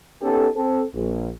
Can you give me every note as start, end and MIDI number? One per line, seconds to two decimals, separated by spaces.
0.22 0.48 59
0.22 0.48 61
0.22 0.48 63
0.22 0.48 67
0.22 0.48 69
0.56 0.83 60
0.56 0.83 69
0.94 1.29 34